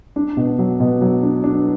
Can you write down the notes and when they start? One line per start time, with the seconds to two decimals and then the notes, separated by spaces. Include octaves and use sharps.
0.16 D4
0.37 B2
0.59 F#3
0.80 B2
1.01 F#3
1.23 D4
1.44 D4